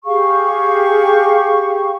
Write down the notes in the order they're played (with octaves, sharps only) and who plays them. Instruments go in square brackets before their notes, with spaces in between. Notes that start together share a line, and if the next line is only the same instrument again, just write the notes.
[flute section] G4 G#4 F5 C#6